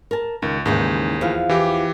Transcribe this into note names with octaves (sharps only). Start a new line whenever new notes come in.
A#4 A5
C#2 D#3
D#2 G#2 C#3 E3
E2 F3 F5
E3 G4